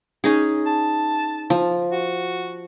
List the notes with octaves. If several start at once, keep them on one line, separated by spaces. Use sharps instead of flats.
C#4 D#4 G#4
A5
F3
F#4